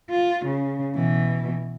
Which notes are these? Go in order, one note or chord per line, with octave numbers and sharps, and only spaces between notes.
F4
C#3
B2 E3